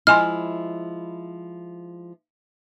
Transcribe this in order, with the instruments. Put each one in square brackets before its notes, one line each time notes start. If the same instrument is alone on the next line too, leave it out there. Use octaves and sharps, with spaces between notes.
[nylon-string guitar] F3 G#3 E4 [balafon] D#5 G#5 C6 [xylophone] F6